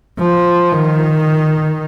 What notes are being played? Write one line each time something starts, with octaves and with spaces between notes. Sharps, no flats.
F3
D#3